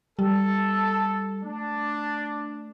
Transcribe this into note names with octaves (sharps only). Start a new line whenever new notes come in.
G3 A4
A3 D4